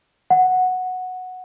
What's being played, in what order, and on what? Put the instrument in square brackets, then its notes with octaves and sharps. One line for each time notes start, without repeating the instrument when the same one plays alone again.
[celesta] F#5